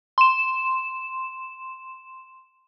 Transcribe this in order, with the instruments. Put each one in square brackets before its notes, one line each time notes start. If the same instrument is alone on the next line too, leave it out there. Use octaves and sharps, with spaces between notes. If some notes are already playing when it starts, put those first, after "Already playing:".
[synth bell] C6 E7